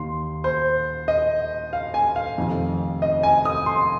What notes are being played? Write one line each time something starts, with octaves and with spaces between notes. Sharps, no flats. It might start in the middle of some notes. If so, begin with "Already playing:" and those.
Already playing: D#2 D#3 C6
C5
D#5
F5
G#5
F5
F1 F2 D#3
D#5
G#5
D#6
C6